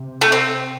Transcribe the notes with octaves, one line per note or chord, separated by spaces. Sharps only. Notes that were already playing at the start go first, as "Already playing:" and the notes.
Already playing: C3
A3
C4